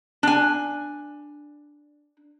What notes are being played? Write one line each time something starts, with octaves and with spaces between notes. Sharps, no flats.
D4 G#5